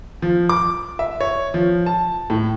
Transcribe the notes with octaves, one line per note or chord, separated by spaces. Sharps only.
F3
D6
E5
C#5
F3
A5
A2